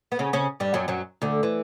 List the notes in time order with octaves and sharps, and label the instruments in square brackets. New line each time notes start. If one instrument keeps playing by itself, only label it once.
[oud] B3
C#3 C#4
C#3 C#4
G2 G3
F#2 F#3
F#2 F#3
D2 D3
E3